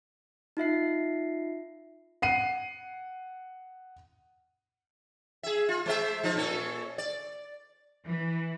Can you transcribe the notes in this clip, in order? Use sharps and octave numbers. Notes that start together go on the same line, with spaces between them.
D#4 F4 E5 C7
F#5 C7 D#7
G#4 E5
F4
G#3 C5 E5
F3 D#4
A#2 C#4 A4
D5
E3